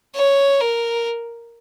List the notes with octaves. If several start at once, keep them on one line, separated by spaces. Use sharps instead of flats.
C#5
A#4